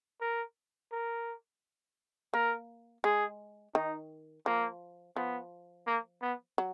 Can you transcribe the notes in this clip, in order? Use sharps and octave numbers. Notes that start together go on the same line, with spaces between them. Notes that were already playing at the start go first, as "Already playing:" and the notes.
A#4
A#4
A#3 A#4
G#3 G#4
D#3 D#4
F3 A#3
F3 B3
A#3
B3
F#3